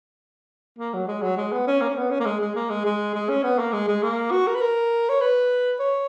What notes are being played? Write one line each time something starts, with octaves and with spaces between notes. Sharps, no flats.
A#3
F#3
G#3
F#3
G#3
B3
C#4
A#3
C#4
B3
C#4
A#3
G#3
G#3
A#3
G#3
G#3
G#3
C#4
B3
A#3
G#3
G#3
A#3
F#4
A#4
B4
A#4
C#5
B4
C#5